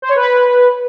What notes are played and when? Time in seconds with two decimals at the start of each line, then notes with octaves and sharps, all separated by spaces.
0.02 C5
0.09 C#5
0.16 B4